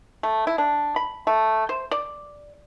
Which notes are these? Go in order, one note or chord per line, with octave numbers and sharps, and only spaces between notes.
A3
E4
D4
B5
A3
C5
D5